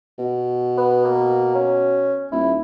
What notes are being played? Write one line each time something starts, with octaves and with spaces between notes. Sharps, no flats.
B2
B3
A#3
C#4
D#1 E4